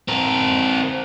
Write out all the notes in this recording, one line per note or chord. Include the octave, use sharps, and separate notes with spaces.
C4 A#4